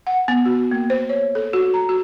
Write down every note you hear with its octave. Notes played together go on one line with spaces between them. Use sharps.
F#5
B3
F#4
A#3
C5
C#5
A4
F#4
A#5
F#4